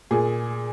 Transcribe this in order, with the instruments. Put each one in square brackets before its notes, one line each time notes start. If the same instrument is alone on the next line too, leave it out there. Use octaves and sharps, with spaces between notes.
[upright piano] A#2 G#4